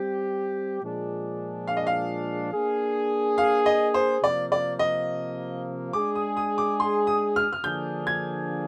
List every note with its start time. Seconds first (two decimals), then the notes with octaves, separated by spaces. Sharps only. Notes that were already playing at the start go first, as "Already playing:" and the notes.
Already playing: G3 C4 G4
0.81 A#2 F3 G#3 D4 G#4
1.68 F5
1.77 D#5
1.87 F5
2.53 A#3 D4 G#4
3.38 F5
3.66 D#5
3.94 C5
4.22 C3 F3 A#3 D5
4.52 D5
4.79 D#5
5.93 G#3 D4 G#4 D6
6.15 D#6
6.37 D#6
6.58 D6
6.80 C6
7.07 D#6
7.36 F6
7.53 F6
7.64 D3 F3 A#3 D4 G#4 G6
8.07 G#6